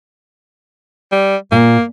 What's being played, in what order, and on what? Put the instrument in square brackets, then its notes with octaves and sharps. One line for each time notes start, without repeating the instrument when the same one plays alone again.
[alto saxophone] G3
[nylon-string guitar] A#2 [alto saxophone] A#3